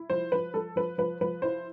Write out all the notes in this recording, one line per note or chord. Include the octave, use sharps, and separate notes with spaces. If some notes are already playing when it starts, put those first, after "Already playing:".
Already playing: E4
F3 C5
F3 B4
F3 A4
F3 B4
F3 B4
F3 B4
E4 C5